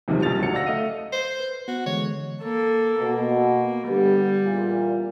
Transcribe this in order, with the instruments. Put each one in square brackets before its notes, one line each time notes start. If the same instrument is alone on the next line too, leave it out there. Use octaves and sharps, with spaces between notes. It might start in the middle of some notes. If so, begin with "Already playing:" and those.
[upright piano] B1 E2 C3 D#3 F3 G3
A#1 C#3 G3 D#4 A6 F7
D2 F#3 C#7
D5 F5 F#5 E6 A#6
A3 D#5 F5 D#7
[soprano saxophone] C5
[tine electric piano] B4
[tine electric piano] B3 [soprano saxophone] F#4
[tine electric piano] D3 E3 G#3 [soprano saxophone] C#5
[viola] A#3 A4
[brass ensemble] B2 [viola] A#3
[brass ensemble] D3 B3 G4 [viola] G3
[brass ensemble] E2 A#2